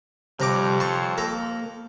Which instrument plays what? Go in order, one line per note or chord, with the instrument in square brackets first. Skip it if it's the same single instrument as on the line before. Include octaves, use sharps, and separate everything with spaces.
[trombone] F2 [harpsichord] C3 A#5 D6 [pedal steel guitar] G3
[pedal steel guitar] C5 C#5 [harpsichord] A5 C#6
[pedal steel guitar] A#3 [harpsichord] A4 A#5